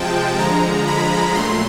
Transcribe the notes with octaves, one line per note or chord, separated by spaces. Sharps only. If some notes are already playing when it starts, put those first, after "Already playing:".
Already playing: C3 F3 G#3 G5 A5
D3 F3 G#3 A#5
B5
A#2 F#3 A3 C6